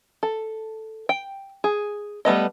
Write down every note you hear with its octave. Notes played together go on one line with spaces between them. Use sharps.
A4
G5
G#4
G3 A3 B3 D#5